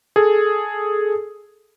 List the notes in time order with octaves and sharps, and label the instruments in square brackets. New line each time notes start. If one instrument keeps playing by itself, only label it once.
[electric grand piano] G#4 A4